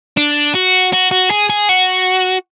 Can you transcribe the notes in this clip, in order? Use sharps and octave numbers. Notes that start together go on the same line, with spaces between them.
D4
F#4
F#4
F#4
G#4
G#4
F#4